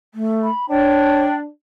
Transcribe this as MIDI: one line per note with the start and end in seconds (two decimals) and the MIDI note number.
0.14 0.47 57
0.43 0.66 83
0.69 1.46 62
0.69 1.24 73
0.69 1.35 79